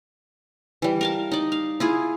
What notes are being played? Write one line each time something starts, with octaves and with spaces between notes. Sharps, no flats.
E3 G3
A#4 F5 A5
D#4 D5
F5
E4 F4 G#4